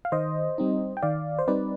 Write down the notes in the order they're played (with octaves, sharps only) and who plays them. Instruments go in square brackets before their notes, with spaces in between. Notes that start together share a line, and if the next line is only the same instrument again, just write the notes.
[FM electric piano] F5
D#3 C5 D#5
G3 C4 D#4
G5
D#3 D5 F5
C5
G3 C4 D#4 B4 D5